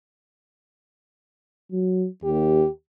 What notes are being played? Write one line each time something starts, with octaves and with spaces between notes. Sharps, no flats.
F#3
D#2 G4